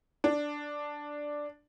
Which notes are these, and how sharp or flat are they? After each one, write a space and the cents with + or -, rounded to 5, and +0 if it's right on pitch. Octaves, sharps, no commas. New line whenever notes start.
D4 +0